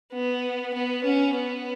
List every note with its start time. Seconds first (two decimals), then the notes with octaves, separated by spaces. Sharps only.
0.13 B3
0.74 B3
1.04 C#4
1.35 B3